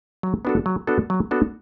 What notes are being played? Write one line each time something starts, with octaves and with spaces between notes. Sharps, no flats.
F#3
B3 D4 F#4 A4
F#3
B3 D4 F#4 A4
F#3
B3 D4 F#4 A4